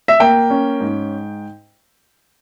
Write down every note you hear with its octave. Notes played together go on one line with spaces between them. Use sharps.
E5
A#3 G5
C#4
G#2